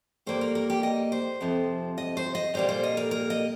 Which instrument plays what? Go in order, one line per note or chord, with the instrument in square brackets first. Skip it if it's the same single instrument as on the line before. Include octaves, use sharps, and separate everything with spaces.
[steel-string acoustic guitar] G2 G3 A#3 C5
A#4
A#4
G4
D#5
C5
F2 C3 F3
D#5
C5
D#5
A#2 G3 A#3 C5
C5
D#5
A#4
A#4
D#5